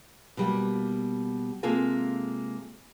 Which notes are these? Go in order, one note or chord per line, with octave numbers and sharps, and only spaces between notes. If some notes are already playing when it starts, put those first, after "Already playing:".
B2 G3 A#3
C3 G#3 A#3 F4 A4 G#5